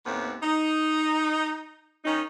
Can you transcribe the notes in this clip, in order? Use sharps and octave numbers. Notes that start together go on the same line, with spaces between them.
D#2 A2 B3 C4
D#4
D#3 C#4 D#4